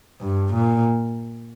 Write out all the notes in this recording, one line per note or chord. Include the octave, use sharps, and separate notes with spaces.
G2
A#2